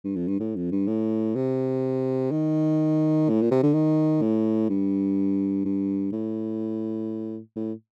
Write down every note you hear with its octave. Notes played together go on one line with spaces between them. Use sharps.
G2
F2
G2
A2
F2
G2
A2
C3
D#3
A2
A#2
C3
D3
D#3
A2
G2
G2
A2
A2